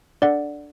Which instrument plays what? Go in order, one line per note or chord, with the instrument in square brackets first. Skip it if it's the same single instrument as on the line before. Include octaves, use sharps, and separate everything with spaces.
[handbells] D4 A4 D5 F#5